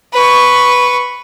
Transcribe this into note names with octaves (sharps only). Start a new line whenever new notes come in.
B4 C#6